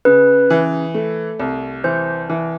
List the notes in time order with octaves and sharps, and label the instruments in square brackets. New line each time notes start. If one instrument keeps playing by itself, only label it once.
[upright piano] C#3 [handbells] B4
[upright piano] E3
A3
C2
[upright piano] E3 [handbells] C5
[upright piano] E3